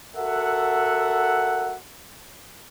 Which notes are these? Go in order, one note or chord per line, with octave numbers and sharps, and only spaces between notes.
F#4 A4 A#4 E5 F#5